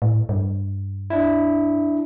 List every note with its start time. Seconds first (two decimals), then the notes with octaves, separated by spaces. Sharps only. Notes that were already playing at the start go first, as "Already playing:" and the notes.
0.02 A2
0.29 G2
1.10 D4 E4